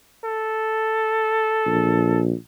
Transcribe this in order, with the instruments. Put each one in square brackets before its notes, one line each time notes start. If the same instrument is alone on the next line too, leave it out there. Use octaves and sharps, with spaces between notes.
[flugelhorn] A4
[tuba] A#1